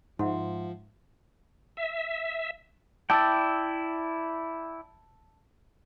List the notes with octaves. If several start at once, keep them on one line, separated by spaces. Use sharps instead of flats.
G#2 F3 E5 F#5 C6
E5
E4 D5 G5 A5 E6 A6